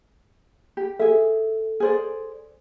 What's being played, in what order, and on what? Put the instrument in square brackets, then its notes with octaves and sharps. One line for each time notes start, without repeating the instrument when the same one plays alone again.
[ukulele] G4
[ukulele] G#4 E5 [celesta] A4
[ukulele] G#4 C5 D5